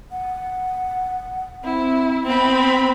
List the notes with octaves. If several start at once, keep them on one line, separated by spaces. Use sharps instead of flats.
F#5
C4 E4
B3 C4 B5